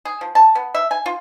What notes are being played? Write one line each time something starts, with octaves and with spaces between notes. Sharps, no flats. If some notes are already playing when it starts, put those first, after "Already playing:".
G#4
F3
A5
B3
E5
G#5
F4